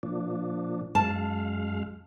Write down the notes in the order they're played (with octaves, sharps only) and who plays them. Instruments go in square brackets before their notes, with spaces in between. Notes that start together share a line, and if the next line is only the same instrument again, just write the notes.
[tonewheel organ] A#2 F3 D4
[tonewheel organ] F#2 G#3 F5 [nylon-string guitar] A5